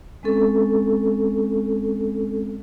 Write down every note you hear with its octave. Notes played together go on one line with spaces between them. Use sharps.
G#3 C4 C#4 A4